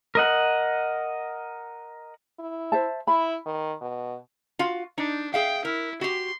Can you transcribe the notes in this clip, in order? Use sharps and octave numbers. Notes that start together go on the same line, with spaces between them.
A#4 D#5 F#5
E4
C5 E5 A5
E4 B5
D#3
B2
F4 F#4 F5
D4 D#4
G#4 E5 F5 G5
E4 A#4
F#4 G4 C6